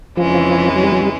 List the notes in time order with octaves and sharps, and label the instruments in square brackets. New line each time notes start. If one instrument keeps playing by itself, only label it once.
[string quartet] F2 C#3 E3 G#3 [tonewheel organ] F3
[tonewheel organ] F#3
G3
F#3
G3